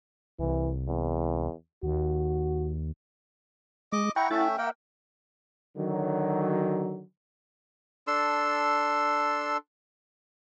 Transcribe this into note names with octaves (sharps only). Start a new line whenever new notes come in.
C2 E3
E2
D#2 F#4
G#3 D#5 D6
E4 F#5 G5 A#5 C#6
A3 C#4 E4 E5 F#5 A6
A#3 A#4 E5 F#5 G5
D3 D#3 F#3
D4 A4 C6 E6